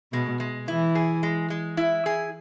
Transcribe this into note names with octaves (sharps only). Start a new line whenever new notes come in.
B2 G#3
G#3
E3 E4
G#4
G#3
G#3
E4
G#4